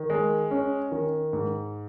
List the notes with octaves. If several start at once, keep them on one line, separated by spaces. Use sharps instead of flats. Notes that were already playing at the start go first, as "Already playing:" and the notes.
Already playing: D#3
G#3
C#4
D#3
G#2